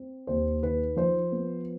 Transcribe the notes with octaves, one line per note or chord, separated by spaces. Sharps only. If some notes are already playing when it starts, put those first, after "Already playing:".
Already playing: C4
D#2 C5
D#3 B4
F3 C5
B3